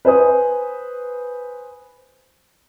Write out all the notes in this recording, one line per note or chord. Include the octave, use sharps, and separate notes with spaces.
B4 C5 G#5 D#6